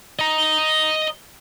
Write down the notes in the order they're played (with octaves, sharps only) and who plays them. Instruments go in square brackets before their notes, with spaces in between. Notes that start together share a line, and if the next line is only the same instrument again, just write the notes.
[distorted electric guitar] D#5 A#5